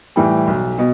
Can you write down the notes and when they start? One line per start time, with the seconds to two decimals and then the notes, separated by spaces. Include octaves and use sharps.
0.16 A2 E3 G3
0.47 B1
0.78 B2